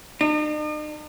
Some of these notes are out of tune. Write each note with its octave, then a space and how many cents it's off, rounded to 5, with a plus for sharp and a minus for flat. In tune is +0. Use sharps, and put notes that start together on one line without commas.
D#4 -45